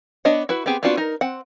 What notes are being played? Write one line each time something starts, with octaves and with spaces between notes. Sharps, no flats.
B3 D4 C#5 D#5 F#5
E4 F#4 B4
B3 C4 G4 G#4
B3 C4 D4 F4 F#4
D#4 A#4
C4 F#5